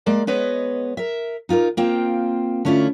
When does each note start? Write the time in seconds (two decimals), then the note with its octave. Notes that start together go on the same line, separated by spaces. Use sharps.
0.06 G#3 A#3 D5
0.27 G#3 B3 B4 C#5 D#5
0.97 A#4 E5
1.49 D#4 F4 G4 A#4
1.77 A#3 C4 F4 G5
2.65 D3 A3 C#4 E4 F4